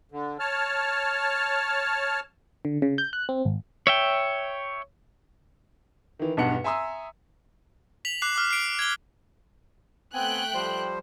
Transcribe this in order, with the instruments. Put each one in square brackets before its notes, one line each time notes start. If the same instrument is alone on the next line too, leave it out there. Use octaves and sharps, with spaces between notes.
[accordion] D3
C#5 A5 F6
[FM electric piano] D3
C#3
G6
F#6
C4
G#1
[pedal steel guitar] C#5 E5 G5
[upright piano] D#3 E3
B1 E2 G2 F#5 C#7
E5 G#5 A#5 C6 D#6 E6
[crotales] B6 F7 F#7
D6 F#6 C7
D6 F6
C7 D7
G#6 G7
[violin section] A3 G5 F#6 [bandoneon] B3 C4 G#5
[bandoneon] F3 G3 C5